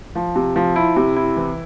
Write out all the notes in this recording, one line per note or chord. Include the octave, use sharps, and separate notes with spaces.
F3
C3
F3
E4
C3
E4
E3